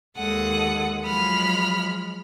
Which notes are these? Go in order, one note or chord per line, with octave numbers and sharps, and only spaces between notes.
D#2 G#3 A4 F#5 D#6
F3 F#3 G#3 B5 F6